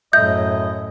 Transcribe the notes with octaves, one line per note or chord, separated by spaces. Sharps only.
F#2 A2 D#5 E5 G6